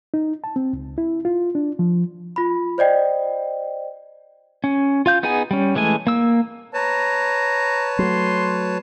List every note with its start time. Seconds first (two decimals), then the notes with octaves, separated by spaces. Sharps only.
0.14 D#4
0.44 A5
0.56 C4
0.73 C#2
0.98 E4
1.25 F4
1.55 D4
1.79 F3
2.36 F4 B5
2.78 C5 D5 D#5 G5
4.64 C#4
5.06 F4 F5 G6
5.23 B3 D#4 G#4 F#5 G#5
5.51 G3 C#4
5.75 E3 G#3 A3 G#5
6.07 A#3 E6
6.74 B4 C#5 A5 A#5
7.99 F#3 A3 C6